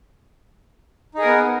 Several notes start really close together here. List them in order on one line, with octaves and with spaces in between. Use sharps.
D#4 G#4 A#4 B3